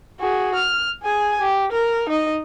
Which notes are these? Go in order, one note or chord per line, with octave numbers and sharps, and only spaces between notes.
F#4 G#4
F6
G#4 G#5
G4
A#4
D#4 D#5